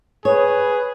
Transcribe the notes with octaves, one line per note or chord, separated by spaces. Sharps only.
G#4 B4 C#5